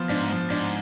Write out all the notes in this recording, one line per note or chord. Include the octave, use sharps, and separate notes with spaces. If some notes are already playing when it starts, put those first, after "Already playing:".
Already playing: F3 B3
G#2 D4
F3
G#2 D4